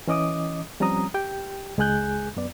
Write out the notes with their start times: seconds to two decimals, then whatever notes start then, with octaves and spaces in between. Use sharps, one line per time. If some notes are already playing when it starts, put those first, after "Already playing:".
0.07 E3 C#4 D#5 D6 D#6
0.80 F3 G3 C4 C#4 A#5 D#6
1.14 G4 G5
1.78 C#2 G#3 G#4 G#5 F#6 G6
2.36 F#2 B3 D5